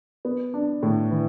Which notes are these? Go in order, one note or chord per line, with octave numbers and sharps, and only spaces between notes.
B3
D4
A2
E3